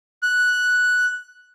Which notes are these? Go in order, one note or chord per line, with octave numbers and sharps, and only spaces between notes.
F#6